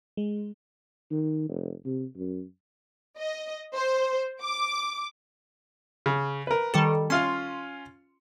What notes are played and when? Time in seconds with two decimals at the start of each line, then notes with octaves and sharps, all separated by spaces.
0.17 G#3
1.11 D#3
1.49 F1
1.85 C3
2.17 F#2
3.17 D#5
3.75 C5
4.40 D6
6.06 C#3
6.47 A#4 B4
6.74 D#3 G3 A4
7.10 C#4 F4 F5 C6